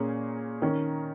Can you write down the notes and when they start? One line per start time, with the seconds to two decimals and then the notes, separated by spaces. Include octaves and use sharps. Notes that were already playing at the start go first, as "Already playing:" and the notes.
Already playing: A#2 A#3 C#4 G#4 C#5
0.62 D#3 C#4 A#4 C#5